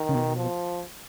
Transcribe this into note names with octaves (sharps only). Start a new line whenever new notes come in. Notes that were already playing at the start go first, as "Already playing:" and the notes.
Already playing: D#3
C#3
B2
F3